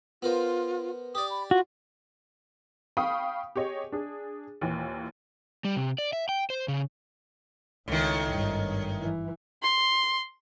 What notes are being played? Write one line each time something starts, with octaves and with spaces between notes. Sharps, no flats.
B3 F4 A#4 C5
G4 D5 D#6
B5
F4 F#4
F5 G5 B5 C#6 D#6
G4 G#4 C#5 D#5
D4 G#4
D#2 A#2 E3
G3
C3
D5
E5
G5
C5
C#3
C#2 A2 D#3
G#1 G2
E3
C6